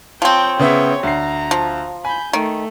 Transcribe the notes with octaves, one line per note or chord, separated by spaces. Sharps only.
F3 C4 C#5 G5
C#3 B3 C#5 E5 G5
D2 A#5 C7
F3
G#5 B5 G6
D#3 A3